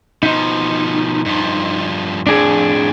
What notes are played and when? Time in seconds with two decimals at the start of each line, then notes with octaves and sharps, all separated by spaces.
0.23 B2 F3 D#4
1.26 G2 F3
2.27 F2 A2 D4 G#4